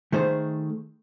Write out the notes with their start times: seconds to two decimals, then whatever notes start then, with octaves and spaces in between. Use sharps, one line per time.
0.12 D#3 A3 G#4 C5